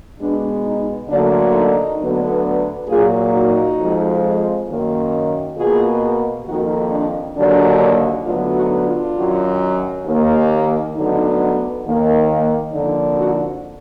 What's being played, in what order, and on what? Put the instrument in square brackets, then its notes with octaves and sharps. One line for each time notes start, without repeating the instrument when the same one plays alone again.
[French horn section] B2 G#3 B3 D4
D#4
D2 D3 F#3 A#3 D4
D#4
D2 D3 F#3 B3
A#2 F#3 A#3 F4 G#4
D#4 F#4
F2 F3 G#3
F#2 D#3 A#3
B2 A#3 F4 G#4
F2 D#3 A#3 D#4 F#4
D4
D#2 D3 F#3 A#3 D4
D2 D3 F#3 B3 D4 F4
D#4 F#4
D4 F4
F#2 D#3 F#3
D#2 D#3 A#3
D2 D3 F#3 B3 D#4
D#2 D#3 A#3
F2 D3 F3 A#3 D#4
D#4 F#4